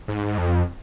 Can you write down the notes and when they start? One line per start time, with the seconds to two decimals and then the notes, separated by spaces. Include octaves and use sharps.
0.08 G#2
0.38 F2